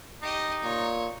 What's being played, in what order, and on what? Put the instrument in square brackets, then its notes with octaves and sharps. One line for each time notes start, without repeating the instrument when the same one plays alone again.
[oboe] D#4 [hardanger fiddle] G4 D#5
[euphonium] A#2 [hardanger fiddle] C#5